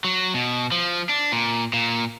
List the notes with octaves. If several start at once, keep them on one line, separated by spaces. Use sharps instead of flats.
F#3
B2
F3
D4
A#2
A#2